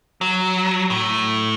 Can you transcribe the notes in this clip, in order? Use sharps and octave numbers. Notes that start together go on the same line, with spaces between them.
F#3
A2